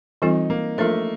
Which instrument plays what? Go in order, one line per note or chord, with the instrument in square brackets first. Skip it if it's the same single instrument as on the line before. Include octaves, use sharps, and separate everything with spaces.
[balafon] E3 G3 C4 F4 A4 [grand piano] D#4
[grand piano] A#3
[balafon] F3 A#3 D4 F4 A#4 [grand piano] A3